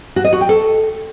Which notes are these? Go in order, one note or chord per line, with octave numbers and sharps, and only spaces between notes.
F#4
D#5
F#4
G5
A4